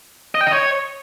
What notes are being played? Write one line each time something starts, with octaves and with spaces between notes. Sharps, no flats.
D#5
G5
D#5
C#5